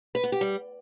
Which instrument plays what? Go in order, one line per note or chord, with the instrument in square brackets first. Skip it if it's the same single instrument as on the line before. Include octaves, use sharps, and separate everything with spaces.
[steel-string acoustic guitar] B4
B3
G4
G3